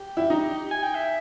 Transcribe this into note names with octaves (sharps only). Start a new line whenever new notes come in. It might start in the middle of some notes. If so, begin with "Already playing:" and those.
Already playing: G4
E4
D#4
G#5
G5
E5